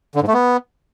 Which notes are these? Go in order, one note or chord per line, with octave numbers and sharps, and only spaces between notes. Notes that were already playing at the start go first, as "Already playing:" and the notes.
D3
G#2
A3
B3